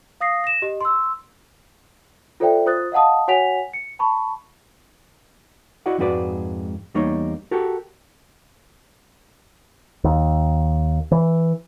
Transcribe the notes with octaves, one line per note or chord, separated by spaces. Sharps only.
F5 D#6 A#6 C7
A#6 E7
G4 D#5
C6 E6
F4 A4 C5 D5 E5 G5
F4 C5 D#6 F#6 A6
D#5 F5 F#5 A5 D#6
F#4 C#5 F#5 G#5 B6 F7
C#7
A5 B5 C#6
E4 F#4 D5 D#5 F#5
F2 G#2 G#3 F#4 B4 D5
E2 G3 A#3 D#4 A#4 C#5
F#4 G4 A4 A#4
D#2
E3